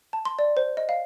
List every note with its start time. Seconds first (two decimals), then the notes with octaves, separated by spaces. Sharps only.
0.13 A5
0.25 C6
0.39 D5
0.57 C5
0.77 D#5
0.89 F5